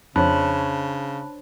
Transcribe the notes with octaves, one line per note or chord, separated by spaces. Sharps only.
F2 C#3 D4 C5 C#5 A5 B5 F#6